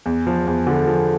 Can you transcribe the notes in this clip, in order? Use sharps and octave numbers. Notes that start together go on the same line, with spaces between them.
E2
F3
E2
D3
F3